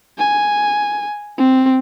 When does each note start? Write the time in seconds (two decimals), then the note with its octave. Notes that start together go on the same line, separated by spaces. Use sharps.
0.18 G#5
1.38 C4